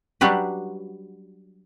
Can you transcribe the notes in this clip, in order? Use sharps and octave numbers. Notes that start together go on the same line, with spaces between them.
F#3 G3 D4 G4 B4